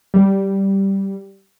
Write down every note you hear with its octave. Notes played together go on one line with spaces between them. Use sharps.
G3